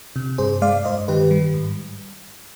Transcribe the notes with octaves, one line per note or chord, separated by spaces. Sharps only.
C3
G2 G#4 C5
G#3 D5 F5
G2 C5 D#5
D#3 G4 B4
G3
G#2